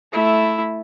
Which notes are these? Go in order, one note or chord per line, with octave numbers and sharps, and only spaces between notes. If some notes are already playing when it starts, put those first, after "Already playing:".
A3 E4